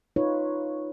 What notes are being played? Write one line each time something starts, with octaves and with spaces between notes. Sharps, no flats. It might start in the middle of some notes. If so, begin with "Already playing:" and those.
D#4 F4 B4 C#5